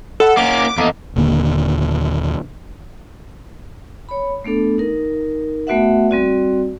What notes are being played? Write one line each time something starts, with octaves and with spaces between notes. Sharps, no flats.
A4 D#5 F#5 B5
A#3 C#4 D6
E2 A3 A#3 D#5
D#1 D#2 D3 A#3
C#5 B5
A3 B3 D4 A4
D#4 A#4
A3 B3 F#4 B4 E5 F#5
G3 C4 F#4 D5